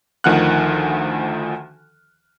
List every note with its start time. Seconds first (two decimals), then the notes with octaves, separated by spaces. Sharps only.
0.24 D2 D#3 F3 F#5 F6 F#6